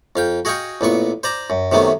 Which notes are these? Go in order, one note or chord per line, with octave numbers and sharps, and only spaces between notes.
F2 F5 G5
F#4 G#4 D#5 F5 G5 C#6
A1 A#2 B3 C#6
C5 D5 A#5
F#2
C3 D#3 F#3 A3 B3